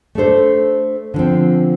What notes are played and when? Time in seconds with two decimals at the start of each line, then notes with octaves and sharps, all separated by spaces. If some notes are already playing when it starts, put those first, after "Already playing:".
0.15 A3 D4 A4 C5
1.14 D3 F3 C4